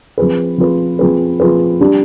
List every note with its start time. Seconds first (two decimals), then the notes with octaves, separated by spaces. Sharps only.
0.18 F3 C4 F4 G#4 B4
0.58 F3 C4 F4 G#4 B4
0.99 F3 C4 F4 G#4 B4
1.40 F3 C4 F4 G#4 B4
1.81 G3 D4 G4